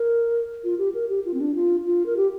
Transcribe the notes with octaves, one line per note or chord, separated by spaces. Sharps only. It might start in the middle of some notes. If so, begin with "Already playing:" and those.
Already playing: A#4
F4
G4
A#4
G4
F4
C4
D4
F4
F4
A#4
G4